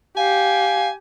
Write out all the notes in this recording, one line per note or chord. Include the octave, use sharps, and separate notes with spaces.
G4 F5 G#5